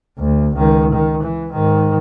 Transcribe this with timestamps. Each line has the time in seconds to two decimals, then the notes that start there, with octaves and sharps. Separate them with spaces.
0.19 D2
0.55 C#2 D#3
0.92 D#3
1.23 E3
1.52 G#2 D#3